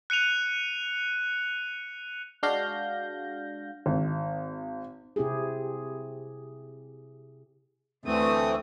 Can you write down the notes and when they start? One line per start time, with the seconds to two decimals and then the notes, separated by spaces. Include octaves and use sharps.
0.10 F#6 C#7 D#7 F7
2.43 G#3 D4 F#4 F5 G6 A#6
3.86 G#1
5.16 C3 C4 E4 G4 G#4
8.05 D2 D3 E3 A3 C4 D#6